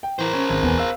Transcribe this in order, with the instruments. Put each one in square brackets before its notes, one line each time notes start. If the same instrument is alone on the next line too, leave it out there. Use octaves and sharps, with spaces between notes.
[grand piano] G5
[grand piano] E3 [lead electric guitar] A#4 C5
[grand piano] C#4
G#1
E1 B3 G#5
F5 E6